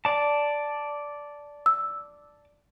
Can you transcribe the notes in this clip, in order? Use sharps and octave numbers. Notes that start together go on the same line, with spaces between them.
D5 A5
E6